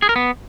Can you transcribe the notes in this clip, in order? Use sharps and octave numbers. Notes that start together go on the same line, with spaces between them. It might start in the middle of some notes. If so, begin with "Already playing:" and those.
G#4
A#4
B3